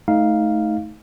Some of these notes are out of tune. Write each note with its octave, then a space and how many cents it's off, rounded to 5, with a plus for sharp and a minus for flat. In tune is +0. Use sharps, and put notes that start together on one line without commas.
A3 -15 D#4 +20 F5 +0